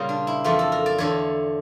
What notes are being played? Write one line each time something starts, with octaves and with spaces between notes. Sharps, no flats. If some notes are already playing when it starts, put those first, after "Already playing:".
Already playing: A#2 C#3 G3 A#3 F4 G4
D4
E4
F2 E3 A3 F4
A4
A#4
D5
E2 D3 A3 C#5